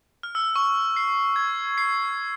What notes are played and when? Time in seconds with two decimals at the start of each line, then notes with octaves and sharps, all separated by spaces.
0.23 F6
0.35 E6
0.56 C#6
0.96 C7
1.36 G#6
1.78 C7